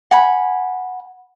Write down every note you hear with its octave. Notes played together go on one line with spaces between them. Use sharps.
F#5 G#5 B5